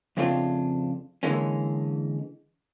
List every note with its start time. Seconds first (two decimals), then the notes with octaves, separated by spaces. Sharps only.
0.17 F2 C#3 A3 C4 D4 F4
1.23 D3 E3 G#3 A#3 C#4